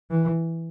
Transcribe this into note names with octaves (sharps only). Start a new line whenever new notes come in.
E3